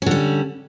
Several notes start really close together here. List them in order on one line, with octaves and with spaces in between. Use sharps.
C#4 D3 G3